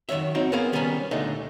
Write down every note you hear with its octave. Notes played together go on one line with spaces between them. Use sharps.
F#2 D#3 A3 C#5 E5
C4 D#4 F#4
B3 G#4 A#4 C5 F5
D#3 G3 B3 C#4 G#5 A#5
D2 A#2 A3 D4 D#4 D#5